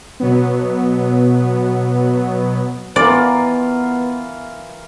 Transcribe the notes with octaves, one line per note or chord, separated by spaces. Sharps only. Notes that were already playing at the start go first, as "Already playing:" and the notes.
B2 F#3 B3
E3 B3 F4 A#4 D5